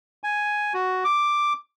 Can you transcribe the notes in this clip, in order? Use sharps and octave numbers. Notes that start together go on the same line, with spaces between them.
G#5
F#4
D6